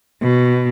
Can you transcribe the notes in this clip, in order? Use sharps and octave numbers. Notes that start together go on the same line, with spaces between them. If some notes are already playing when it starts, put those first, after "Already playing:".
B2